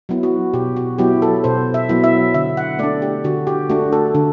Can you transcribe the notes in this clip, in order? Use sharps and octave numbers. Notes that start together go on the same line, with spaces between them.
F#3 B3 E4
F#4
B2 G4
F#4
F#3 B3 E4 G4
A4
B2 C5
E5
F#3 B3 E4
E5
D3 E5
F#5
A3 D4 D5
G4
D3 F#4
G4
A3 D4 F#4
A4
D3